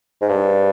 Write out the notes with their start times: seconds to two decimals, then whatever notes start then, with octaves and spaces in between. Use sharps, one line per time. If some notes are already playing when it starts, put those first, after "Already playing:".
0.21 G#2
0.29 G2